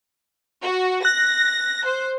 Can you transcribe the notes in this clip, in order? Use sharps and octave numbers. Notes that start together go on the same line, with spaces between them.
F#4
F#6 A#6
C5